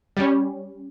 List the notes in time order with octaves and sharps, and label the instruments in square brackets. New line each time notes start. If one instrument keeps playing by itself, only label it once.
[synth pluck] G3 C#4